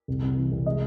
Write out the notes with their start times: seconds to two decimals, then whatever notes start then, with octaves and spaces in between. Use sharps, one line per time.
0.08 C2
0.22 C2
0.37 E3
0.51 C2
0.65 G#3 D#5